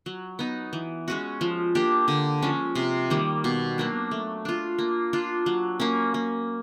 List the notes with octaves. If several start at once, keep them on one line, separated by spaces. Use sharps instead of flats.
F#3
B3 D#4
E3
G#3 C#4 F#4
F3
A#3 D4 G4
D3
F3 G#3 C#4
C3
D#3 G3 A#3
B2
F#3 A#3 D4
A3
D4 F4
A#3
D4 F4
F#3
A#3 C#4
A#3